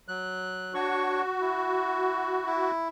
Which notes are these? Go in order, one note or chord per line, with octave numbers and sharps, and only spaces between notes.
F#3 F#6
D4 F#4 C#5 C#6
E4
E4